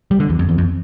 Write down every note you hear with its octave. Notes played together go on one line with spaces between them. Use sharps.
G3
D3
E2
F2
E2
F2